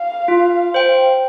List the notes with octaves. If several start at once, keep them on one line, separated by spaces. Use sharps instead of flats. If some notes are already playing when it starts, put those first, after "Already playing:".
Already playing: F5
F4
C5 G5